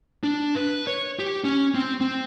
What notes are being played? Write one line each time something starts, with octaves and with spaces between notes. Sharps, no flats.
D4
B4
C#5
G4
C#4
C4
C4